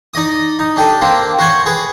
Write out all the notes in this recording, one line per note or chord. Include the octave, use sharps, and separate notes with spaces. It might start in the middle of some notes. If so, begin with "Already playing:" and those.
D#4 D5 D#5 D#6
D#4
D4 G4 A4
A#3 C4 D4
F#4 C5 C#5 C#6
G#4 B4